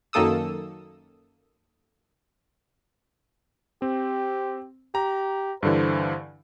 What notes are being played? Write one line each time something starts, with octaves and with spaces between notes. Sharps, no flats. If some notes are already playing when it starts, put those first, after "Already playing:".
F#2 D#3 A#3 A4 D#6 E6
C4 G4
G4 A#5
G2 D3 E3 C5